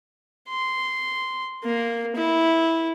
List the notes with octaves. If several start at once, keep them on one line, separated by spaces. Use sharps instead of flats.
C6
A#3
E4